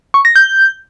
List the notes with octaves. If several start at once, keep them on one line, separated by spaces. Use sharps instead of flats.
C#6
A#6
G6